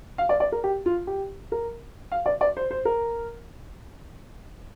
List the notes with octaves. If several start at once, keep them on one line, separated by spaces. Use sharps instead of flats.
F5
D5
D5
A#4
G4
F4
G4
A#4
F5
D5
D5
C5
C5
A#4